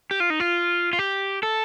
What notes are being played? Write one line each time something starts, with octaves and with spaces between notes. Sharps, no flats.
G4
F4
D#4
F4
F4
G4
A4